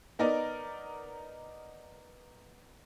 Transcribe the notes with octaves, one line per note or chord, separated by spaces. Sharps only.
B3 D#4 A#4 D5